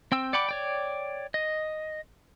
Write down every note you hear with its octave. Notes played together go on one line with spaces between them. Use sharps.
C4 G5 E6
D5 F#5 G5 B5 D6
C#5 D5 G5
D#5